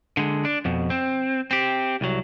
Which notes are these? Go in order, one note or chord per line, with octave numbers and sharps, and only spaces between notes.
D3 G#3
D4
F2 B2
C4
C4 G4
C2 F#3